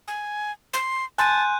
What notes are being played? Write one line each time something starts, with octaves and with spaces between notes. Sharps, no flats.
G#5
C6
G#5 A5 C6 F#6 G6 D#7